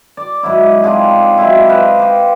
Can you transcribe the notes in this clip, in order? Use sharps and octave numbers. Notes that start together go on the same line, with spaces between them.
D5
G#2 F#3 E4
C4 D4 F4 G#4
F#3 G#3 E4
B4 C5 D#5 F5
G5 D6